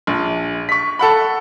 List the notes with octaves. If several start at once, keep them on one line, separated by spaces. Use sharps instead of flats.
A#1
C#6 B6
A4 F#5 B5